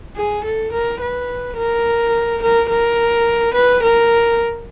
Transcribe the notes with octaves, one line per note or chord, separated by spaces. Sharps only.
G#4
A4
A#4
B4
A#4
A#4
A#4
B4
A#4